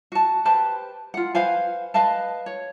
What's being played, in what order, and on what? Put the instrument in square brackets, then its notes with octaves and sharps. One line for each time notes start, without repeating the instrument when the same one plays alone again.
[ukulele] F#4 A5
G4 B4 C5 A5
F4 F#5
B4 C5 F5 G#5
B4 D#5 F5 A5
C#5